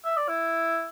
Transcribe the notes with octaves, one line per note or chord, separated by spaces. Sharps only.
E5
D5
E4